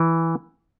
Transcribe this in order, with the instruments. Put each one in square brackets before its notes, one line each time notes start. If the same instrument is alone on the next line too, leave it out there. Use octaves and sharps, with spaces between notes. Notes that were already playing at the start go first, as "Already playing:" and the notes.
Already playing: [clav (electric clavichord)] E3